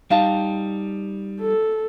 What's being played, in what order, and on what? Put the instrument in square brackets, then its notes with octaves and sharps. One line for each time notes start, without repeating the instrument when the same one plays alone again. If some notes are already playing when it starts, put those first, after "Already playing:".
[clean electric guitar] G3 D#4 A5 [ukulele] F5 G5
[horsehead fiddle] A4